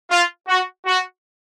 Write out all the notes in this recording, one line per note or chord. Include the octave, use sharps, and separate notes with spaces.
F4
F#4
F#4